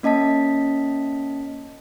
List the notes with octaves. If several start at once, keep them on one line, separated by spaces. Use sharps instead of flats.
A#3 C#4 D#5 A5 B6